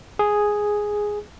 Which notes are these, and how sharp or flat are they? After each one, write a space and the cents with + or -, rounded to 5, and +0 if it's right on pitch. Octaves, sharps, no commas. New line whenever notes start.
G#4 +0